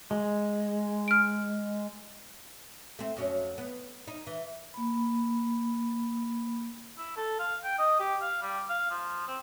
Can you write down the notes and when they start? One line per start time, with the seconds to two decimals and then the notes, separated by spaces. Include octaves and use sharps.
0.11 G#3
1.08 F6 D7
2.99 A3 C4
3.17 F2 F#3 C#4
3.58 B3
4.08 D#4
4.27 E3
4.74 A#3 B5
6.98 E4
7.17 A4
7.39 F5
7.64 G5
7.78 D#5
8.00 G4
8.21 F5
8.42 G3
8.70 F5
8.91 F3
9.28 C4